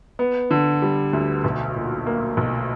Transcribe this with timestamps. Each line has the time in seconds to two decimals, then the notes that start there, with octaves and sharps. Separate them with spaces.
0.19 B3
0.51 D3
0.82 G3
1.13 D2
1.44 B1
1.75 A#2
2.07 A#3
2.37 B1